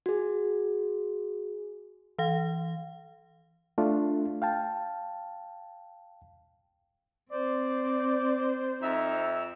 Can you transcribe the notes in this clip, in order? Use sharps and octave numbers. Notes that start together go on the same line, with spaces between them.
F#4 G#4
E3 F5
A3 D4 F4
F5 G5 A5
C4 C5 D5
F2 D#4 E5